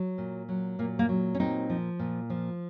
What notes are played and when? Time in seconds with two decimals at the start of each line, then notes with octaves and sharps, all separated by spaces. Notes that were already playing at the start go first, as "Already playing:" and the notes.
Already playing: F#3
0.18 A#2
0.49 F#3
0.79 A#2 A#3
0.99 A#3
1.09 F#3
1.35 C#4
1.39 A#2 C4 D#4
1.70 F3
1.99 A#2
2.30 F3